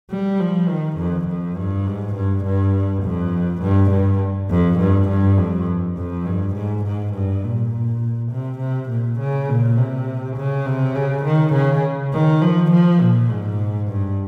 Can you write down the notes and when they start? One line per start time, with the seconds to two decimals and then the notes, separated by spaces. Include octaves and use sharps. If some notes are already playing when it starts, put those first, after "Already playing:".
0.10 G3
0.40 F3
0.68 D#3
0.98 F2
1.27 F2
1.57 G2
1.86 G#2
2.15 G2
2.45 G2
3.03 F2
3.62 G2
3.91 G2
4.50 F2
4.80 G2
5.09 G2
5.38 F2
5.97 F2
6.26 G2
6.56 G#2
6.85 G#2
7.14 G2
7.43 A#2
8.32 C3
8.60 C3
8.90 A#2
9.19 C#3
9.49 A#2
9.77 C3
10.36 C#3
10.66 C3
10.95 C#3
11.25 D#3
11.54 C#3
12.13 D#3
12.42 F3
12.71 F3
13.01 A#2
13.29 G#2
13.88 G2